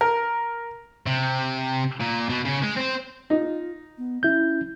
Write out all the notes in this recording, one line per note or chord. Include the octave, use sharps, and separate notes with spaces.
A#4
C3
A#2
B2
C#3 C#4
G#3
C4 C5
D#4 F4
B3
C#4 E4 G6